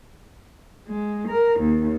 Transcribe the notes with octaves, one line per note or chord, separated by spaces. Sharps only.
G#3
A#4
D#2